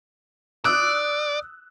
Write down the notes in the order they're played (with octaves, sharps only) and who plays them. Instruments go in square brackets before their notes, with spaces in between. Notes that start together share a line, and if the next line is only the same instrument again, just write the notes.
[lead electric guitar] D5 [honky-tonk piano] D#6 E6 F#6